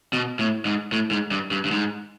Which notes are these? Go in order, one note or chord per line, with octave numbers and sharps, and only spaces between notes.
B2
A2
G#2
A2
G#2
G2
G2
G2
G#2